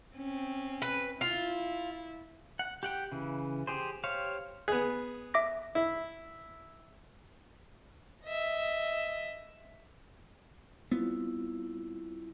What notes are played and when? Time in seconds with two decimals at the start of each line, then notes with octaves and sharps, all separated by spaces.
0.16 C4 C#4
0.82 B4
1.21 E4 F4
2.59 F#5
2.83 G4 F#5 G5
3.12 C#3 E3
3.67 G4 G#4 C5
4.04 G4 C5 C#5 F5
4.68 B3 G#4
5.34 E5 D6 A#6
5.75 E4
8.24 D#5 E5
10.91 G3 B3 C4 E4 F4